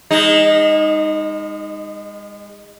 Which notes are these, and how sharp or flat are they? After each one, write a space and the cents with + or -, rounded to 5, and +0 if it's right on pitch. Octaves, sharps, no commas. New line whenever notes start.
G#3 -35 D#4 +0